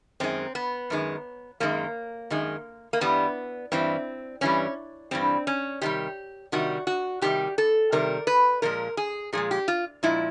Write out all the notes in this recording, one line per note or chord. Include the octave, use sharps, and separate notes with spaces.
F#2 D#3 G#3 C4
B3
F#2 D#3 G#3
F#2 D#3 G#3 A#3
F#2 D#3 G#3
A#3
G2 E3 G3 B3
G2 E3 G3 C4
G2 E3 G3 C#4
G2 E3 G3 C4
C#4
C3 D#3 G3 G4
C3 D#3 G3 F#4
F#4
C3 D#3 G3 G4
A4
C3 D#3 G3 A#4
B4
A#2 F3 G#3 A#4
G#4
A#2 F3 G#3 G#4
G4
F4
A#2 F3 G#3 E4